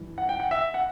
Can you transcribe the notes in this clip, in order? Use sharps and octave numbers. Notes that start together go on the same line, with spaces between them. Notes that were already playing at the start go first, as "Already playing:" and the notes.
Already playing: G2 E3
F#5
G5
F#5
E5
F#5